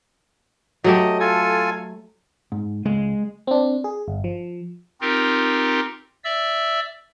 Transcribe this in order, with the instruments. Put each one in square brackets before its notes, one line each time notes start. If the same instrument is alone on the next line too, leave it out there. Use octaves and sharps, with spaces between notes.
[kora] F#3 A3 G4 [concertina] D#5
[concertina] F4 A4 G#5
[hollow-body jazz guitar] G#2
[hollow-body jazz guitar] C#2 [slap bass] G#3
[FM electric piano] C4 D4
G#4
G1
F3
[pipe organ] C4 D#4 F4 G4 A#4
D5 E5 E6